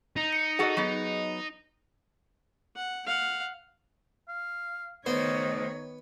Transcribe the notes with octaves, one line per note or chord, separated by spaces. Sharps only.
D#4
C#7
F#4 G#4 A4 D#5 F#5
F#3 B3
F#5
F5 F#5
F5
D#3 A3 B3 C5 C#5 D#5